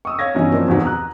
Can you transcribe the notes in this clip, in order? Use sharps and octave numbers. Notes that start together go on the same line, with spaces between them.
C#6 D#6 E6
C#5 F5 G#6 A#6
G2 B2 E3 C#4 D#4
F3 A#3 C4 D4
E2 G#2 B2 D#3
A#5 D#6 F#6